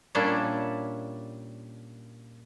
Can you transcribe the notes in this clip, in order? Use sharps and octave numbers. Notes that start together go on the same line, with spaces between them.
A#2 G3 C#4 D4 E5